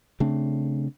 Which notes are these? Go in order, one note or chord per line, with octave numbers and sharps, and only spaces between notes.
C#3 A3 C4 D4